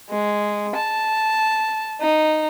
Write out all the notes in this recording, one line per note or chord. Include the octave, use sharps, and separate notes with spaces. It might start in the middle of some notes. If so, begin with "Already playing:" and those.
G#3
A5
D#4